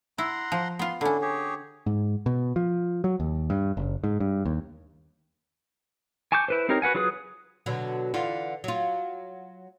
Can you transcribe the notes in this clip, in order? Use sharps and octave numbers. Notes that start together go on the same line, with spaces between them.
E4 F#5 A#5 C6
F3
B3 F4 C6
D3 C#4 D4 E4
G4 G#4 C#5
G#2
B2
F3
F#3
D#2
G2
F#1
G#2
G2
D#2
G#5 A5 C#6 D6 G6
E4 B4 C5
C4 D#4 G4 A#4 C#5
F#4 B4 F#5 G#5
F#3 F4 G#4 B4 D#6
B2 D3 F#3
D3 E3 F4
F#3 F4